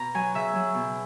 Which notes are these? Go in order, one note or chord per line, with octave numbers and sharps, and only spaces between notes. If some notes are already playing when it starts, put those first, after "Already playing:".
Already playing: B2 A#5
F#3 G#5
C#3 E5
F#3
B2